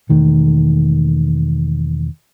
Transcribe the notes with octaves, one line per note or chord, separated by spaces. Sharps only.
E1 D#3 A3